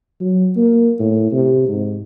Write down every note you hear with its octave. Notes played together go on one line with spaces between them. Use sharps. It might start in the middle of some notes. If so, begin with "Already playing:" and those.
F#3
A#3
A2
C3
G#2